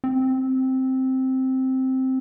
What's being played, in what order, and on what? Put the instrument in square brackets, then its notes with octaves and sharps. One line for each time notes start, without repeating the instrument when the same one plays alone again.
[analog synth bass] C4